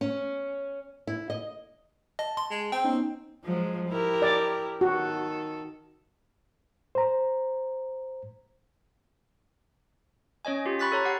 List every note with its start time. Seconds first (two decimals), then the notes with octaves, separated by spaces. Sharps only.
0.01 C#4
1.07 E4
1.30 D#5
2.19 D#5 A5
2.37 C6
2.51 G#3
2.72 C4 G5
2.84 B3 C#4 D#4
3.44 F3 F#3 G#3
3.89 E4 G4 A#4
4.22 D5
4.81 D#3 F#4 A4
6.95 C5 A#5
10.45 C#4 C#5 D#5 G#5
10.66 F4 G4
10.79 B5 C#6 F#6 A6 B6
10.92 A4 C#5 A#5
11.05 G4 F#5 C7